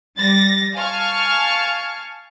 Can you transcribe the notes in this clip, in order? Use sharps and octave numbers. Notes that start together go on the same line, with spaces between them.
G3 A6 A#6
F5 G#5 A5 C#6 F6